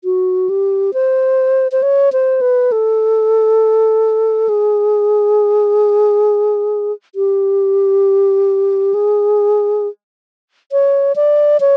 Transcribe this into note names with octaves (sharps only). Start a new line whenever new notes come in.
F#4
G4
C5
C5
C#5
C5
B4
A4
G#4
G4
G#4
C#5
D5
C#5